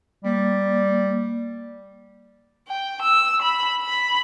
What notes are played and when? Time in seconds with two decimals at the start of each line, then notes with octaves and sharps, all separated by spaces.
0.25 G3 A#3
2.68 G5
3.02 E6
3.42 B5
3.82 B5